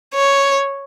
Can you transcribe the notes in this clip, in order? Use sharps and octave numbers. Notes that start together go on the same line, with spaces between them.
C#5